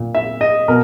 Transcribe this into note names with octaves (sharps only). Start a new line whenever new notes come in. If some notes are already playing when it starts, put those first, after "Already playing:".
Already playing: A#2
E5
D#5
B2 A#4